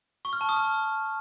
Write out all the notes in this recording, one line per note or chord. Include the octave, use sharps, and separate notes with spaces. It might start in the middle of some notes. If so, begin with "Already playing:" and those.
C#6
F6
A5
D#6
F6